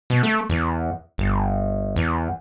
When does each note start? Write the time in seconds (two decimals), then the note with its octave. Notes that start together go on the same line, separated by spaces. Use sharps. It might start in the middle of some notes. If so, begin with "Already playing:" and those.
0.10 B2
0.23 A3
0.50 E2
1.18 G1
1.96 E2